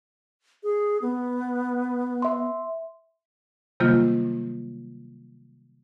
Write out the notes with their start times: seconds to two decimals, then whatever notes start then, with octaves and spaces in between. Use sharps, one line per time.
0.63 G#4
1.02 B3
2.22 E5 C6
3.80 C3 D#3 F#3 G3 A#3 F4